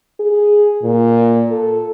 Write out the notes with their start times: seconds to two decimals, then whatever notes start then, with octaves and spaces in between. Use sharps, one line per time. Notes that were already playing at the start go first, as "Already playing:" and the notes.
0.20 G#4
0.83 A#2
1.51 A4